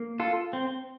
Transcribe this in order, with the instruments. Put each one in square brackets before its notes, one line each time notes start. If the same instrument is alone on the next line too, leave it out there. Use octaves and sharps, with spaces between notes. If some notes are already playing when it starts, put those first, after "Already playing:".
Already playing: [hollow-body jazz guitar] A#3
[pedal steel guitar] F4 A4
C4